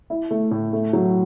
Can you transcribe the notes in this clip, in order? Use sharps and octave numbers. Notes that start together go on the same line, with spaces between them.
E4
A3
A2
A3
F#3